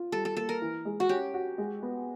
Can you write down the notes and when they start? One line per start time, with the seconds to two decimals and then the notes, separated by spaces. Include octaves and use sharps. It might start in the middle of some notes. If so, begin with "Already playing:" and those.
Already playing: F4
0.12 G3 A4
0.25 A4
0.37 A#3 A4
0.49 A#4
0.62 E3
0.85 G#3
1.00 F#4
1.09 C#4 G4
1.34 F#4
1.58 G#3
1.82 B3